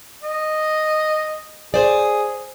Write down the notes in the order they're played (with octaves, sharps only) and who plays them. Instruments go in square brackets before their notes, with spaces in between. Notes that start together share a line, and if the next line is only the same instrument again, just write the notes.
[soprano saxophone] D#5
[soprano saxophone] G#4 [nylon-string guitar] C5 D5